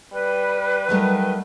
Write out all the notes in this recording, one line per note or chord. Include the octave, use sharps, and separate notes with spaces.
G3 B4
D#3 F#3 G3 A3